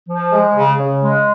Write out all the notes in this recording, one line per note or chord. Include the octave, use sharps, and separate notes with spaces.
F3
G#3
C#3
C#3
G#3